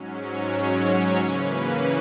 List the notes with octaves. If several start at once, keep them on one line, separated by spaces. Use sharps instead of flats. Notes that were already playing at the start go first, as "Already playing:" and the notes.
Already playing: G#2 F#3 C#4
C#5
C#5
C#5
C#3 E3 A#3 C#4 B4